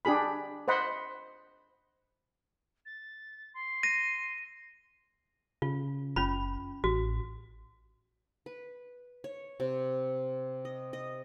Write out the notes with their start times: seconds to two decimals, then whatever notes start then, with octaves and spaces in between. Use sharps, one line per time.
0.05 D4 G4 G#4 B5
0.68 C5 D#5 F#5 B5 C6
2.86 A6
3.54 C6
3.83 A#6 D#7
5.62 C#3 F4
6.16 F#1 C#4 F4 B5
6.84 A1 F#4
8.46 B4
9.24 C#5
9.60 C3
10.65 D#5
10.93 D#5